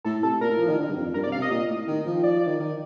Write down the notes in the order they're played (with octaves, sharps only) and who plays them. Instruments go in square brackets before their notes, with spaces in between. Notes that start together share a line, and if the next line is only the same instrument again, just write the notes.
[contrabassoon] A2 [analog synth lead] A4
[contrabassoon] C3 [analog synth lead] A4
[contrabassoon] A#2 [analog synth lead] A#4
[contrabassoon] A2
F3
D#3
D3
G2
F2
[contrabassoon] G2 [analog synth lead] A#4
[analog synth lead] D5
[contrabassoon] C3
[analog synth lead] F5
[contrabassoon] C3
[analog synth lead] D#5
[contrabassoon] A#2
A2
D#3
F3
[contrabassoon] F3 [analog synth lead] D5
[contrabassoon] F3
D#3
D#3